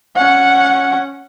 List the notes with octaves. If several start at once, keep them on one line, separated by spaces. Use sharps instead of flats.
C#4 F#5